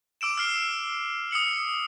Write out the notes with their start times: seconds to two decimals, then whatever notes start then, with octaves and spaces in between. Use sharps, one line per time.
0.21 D6 E6 D7 E7
0.38 E6 F6 C7 G7
1.31 D#6 E6 C#7 F#7